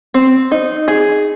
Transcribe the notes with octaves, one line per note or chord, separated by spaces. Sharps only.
C4
D#4
G#4